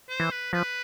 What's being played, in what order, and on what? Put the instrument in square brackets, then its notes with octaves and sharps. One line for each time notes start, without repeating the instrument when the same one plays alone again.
[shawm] C5
[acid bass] E3
[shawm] B4
[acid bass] F3 [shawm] B4